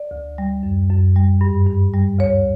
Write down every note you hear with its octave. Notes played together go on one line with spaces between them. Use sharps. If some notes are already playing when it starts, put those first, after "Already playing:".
Already playing: D5
D2
G3
F#2
F#2
G3
G2
G2
G3
D2 C#5